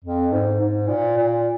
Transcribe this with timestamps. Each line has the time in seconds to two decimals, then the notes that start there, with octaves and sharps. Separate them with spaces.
0.05 F2
0.32 G#2
0.61 G#2
0.88 A#2
1.17 A#2